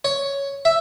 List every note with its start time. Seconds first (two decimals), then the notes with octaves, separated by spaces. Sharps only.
0.05 C#5
0.65 E5